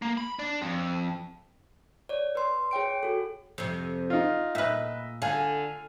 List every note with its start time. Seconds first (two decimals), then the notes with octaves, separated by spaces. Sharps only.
0.02 A#3
0.17 B5
0.39 D4
0.62 F2
2.09 C#5 D5
2.35 B4 C6
2.71 G#4 C#5 G5 D7
3.03 F#4 A4
3.58 F2 C3
4.10 D#4 F4
4.55 A#2 B4 D#5 E5
5.22 D3 F5 G#5